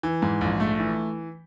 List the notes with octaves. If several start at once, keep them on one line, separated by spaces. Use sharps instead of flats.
E3
G#2
A#1
A3
E3